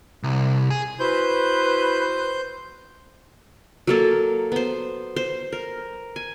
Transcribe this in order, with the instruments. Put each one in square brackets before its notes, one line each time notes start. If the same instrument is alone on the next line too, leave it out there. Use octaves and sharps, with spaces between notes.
[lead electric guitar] C2
G#4
[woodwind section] E4 F#4 B4 [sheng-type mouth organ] C5 G6
[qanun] F#3 A#3 A4
B3 C5
C5
A#4
G#5